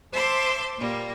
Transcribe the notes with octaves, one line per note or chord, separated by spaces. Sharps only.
C5 E5 A5 C6 D6 E6
A#2 G3 A#3